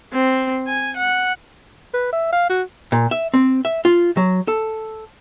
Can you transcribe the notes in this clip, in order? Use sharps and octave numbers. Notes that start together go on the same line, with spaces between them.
C4
G#5
F#5
B4
E5
F5
F#4
A#2
E5
C4
E5
F4
F#3
A4